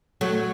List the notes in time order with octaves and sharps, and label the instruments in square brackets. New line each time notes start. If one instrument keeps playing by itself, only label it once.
[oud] F#3 A3